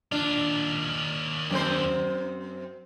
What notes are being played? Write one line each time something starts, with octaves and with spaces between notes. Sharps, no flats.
D#2 D4 F4
F#2 C4 C5